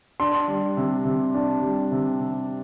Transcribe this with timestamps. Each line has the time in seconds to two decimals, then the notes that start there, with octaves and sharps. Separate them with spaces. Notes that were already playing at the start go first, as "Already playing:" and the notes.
0.20 D4 C6
0.48 G3
0.77 C3
1.05 C3
1.34 D4
1.62 G3
1.92 C3
2.20 C3